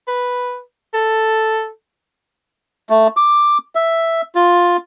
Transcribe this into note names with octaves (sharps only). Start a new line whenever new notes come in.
B4
A4
A3
D6
E5
F4